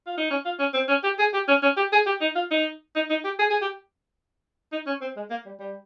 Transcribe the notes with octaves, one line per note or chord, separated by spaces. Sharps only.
F4
D#4
C#4
F4
C#4
C4
C#4
G4
G#4
G4
C#4
C#4
G4
G#4
G4
D#4
F4
D#4
D#4
D#4
G4
G#4
G#4
G4
D#4
C#4
C4
G#3
A#3
G3
G3